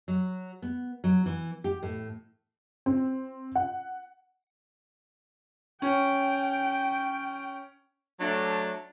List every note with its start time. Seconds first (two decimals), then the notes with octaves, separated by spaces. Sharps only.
0.08 F#3
0.62 B3
1.04 F#3
1.26 E3
1.64 G4
1.83 A2
2.86 C4
3.55 F#5
5.82 C#4 G5
8.21 F#3 A3 D4